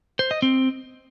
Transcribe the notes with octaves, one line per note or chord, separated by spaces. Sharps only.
C5
D#5
C4